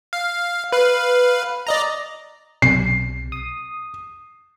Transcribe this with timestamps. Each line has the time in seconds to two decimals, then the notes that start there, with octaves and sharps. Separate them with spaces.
0.13 F5
0.73 B4 F5
1.67 D5 D#5 A#5
2.62 B1 C3 C7
3.32 D#6